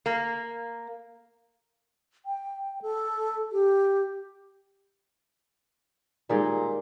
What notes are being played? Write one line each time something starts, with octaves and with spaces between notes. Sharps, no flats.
A#3
G5
A4
G4
A#2 D#3 G3 G#3